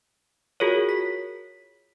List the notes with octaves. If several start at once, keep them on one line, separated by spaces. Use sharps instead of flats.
F4 F#4 G#4 A#4 C#5
B6